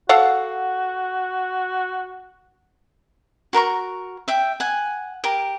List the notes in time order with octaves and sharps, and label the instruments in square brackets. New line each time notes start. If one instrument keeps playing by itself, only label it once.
[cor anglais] F#4 [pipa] A4 F5 F#5
[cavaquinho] F#4 A#4 A#5 C#6
E5 G5
F#5 G#5
G4 A#4